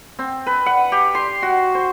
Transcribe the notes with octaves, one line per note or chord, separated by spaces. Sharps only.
C4
B4
F#5
G4
C6
F#4
C5